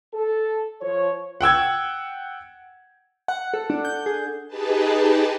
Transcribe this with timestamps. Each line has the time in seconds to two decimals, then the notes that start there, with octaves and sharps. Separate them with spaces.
0.14 A4
0.82 F3 C#5
1.41 F#5 G5 E6 G#6
3.28 F#5
3.54 A4
3.70 D4
3.85 G6
4.06 G#4
4.47 D#4 G4 G#4 B4 A5